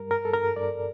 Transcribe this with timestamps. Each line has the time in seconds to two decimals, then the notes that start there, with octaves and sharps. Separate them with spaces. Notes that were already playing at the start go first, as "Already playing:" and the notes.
Already playing: G2 G3 A#4
0.11 G2 A#4
0.25 A4
0.34 G2 A#4
0.56 G2 D5